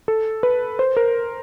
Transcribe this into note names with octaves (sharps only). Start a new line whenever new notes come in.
A4
B4
C5
A#4